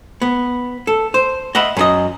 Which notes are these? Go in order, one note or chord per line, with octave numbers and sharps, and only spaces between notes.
B3
A4
C5
D#5 E5 F#5 B5
F#2 G#4 D#5